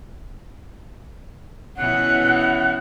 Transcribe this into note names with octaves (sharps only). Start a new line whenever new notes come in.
B2 E3 C#4 F#5